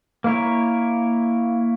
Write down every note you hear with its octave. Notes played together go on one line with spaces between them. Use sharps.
A#3 E4 A#4 C#5